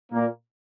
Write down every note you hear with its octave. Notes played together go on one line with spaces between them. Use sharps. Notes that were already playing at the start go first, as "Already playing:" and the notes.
A#2 A#3